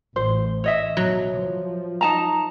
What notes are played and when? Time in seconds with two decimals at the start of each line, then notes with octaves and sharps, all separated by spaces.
0.16 A1 C5
0.64 C#5 D#5 E5
0.97 B2 F#3
1.38 F3
2.01 D#4 A5 A#5